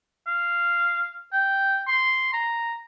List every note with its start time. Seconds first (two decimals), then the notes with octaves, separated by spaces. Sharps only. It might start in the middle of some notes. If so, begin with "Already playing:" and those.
0.27 F5
1.33 G5
1.88 C6
2.34 A#5